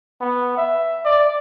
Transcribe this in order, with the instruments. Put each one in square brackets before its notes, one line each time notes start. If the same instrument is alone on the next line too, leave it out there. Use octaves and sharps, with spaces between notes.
[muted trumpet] B3
E5
D5